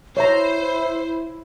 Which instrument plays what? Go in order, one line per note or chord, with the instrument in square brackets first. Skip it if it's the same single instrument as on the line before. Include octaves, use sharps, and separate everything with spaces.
[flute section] E4 [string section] C5 [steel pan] C#5 E5 A#5